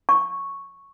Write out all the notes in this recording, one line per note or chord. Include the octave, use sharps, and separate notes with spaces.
C#6